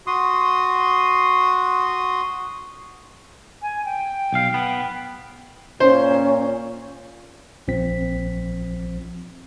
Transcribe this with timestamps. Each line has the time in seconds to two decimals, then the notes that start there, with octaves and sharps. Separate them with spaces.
0.07 F#4 C6 D#6
3.62 G#5
3.85 G5
4.33 B1 F5
4.54 B3
5.80 A#2 C#4 C5
7.68 A#1 F3 C4 B6